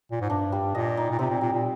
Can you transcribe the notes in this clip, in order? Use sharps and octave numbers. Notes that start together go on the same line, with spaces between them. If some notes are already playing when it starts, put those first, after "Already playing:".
A#2
G#2
G2 D4
G3
A#2 D#5
D#4
A#2
C3 C4
A#2
A#2 G3
A#2